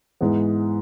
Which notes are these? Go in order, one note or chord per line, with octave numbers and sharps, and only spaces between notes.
G#2 E3 G#3 B3